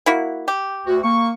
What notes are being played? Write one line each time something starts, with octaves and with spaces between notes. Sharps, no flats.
A#3 E4 F#4
G4
D2 F#4
A#3 C#6